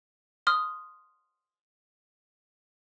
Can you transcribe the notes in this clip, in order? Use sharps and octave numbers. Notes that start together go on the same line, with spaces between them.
C6 D#6 F6